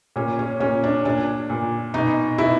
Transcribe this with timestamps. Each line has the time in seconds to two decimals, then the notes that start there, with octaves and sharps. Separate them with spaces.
0.16 A#2 C#4
0.39 C#4
0.60 A#2 C#4
0.84 D4
1.05 A#2 D4
1.50 A#2
1.94 B2 D#4
2.38 B2 E4